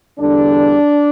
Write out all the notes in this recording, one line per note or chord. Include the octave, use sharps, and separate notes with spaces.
E2 D3 G3 D4